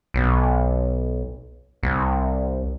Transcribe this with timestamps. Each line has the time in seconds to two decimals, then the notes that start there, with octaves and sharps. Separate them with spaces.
0.14 B1
1.83 C2